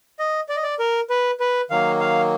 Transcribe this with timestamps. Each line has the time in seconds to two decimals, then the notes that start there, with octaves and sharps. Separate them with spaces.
0.19 D#5
0.49 D5
0.56 D#5
0.63 D5
0.79 A#4
1.10 B4
1.40 B4
1.70 D#3 F#3 A#3 F5
2.00 F5